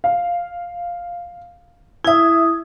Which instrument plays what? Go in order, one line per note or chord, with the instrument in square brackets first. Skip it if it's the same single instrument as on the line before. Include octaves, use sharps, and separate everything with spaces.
[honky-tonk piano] F5
[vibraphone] E4 D#6 [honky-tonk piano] E5 G#6